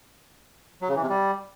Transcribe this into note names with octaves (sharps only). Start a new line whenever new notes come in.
F#3
C#3
E3
C3
G3